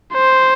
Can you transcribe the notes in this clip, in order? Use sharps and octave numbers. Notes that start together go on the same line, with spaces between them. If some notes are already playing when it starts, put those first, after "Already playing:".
C5